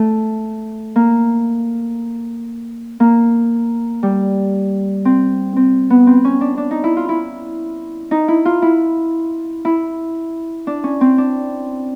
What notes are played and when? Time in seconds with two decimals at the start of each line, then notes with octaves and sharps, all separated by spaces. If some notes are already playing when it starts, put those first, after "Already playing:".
Already playing: A3
0.96 A#3
3.00 A#3
4.03 G3
5.05 C4
5.56 C4
5.90 B3
6.07 C4
6.25 C#4
6.41 D4
6.57 D4
6.71 D#4
6.84 E4
6.97 F4
7.09 E4
8.11 D#4
8.28 E4
8.45 F4
8.62 E4
9.65 E4
10.67 D4
10.84 C#4
11.01 C4
11.18 D4